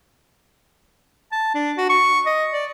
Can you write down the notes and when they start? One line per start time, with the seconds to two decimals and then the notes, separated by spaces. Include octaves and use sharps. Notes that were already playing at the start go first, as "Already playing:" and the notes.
1.32 A5
1.55 D4
1.77 F#4
1.90 C#6
2.26 D#5
2.52 D5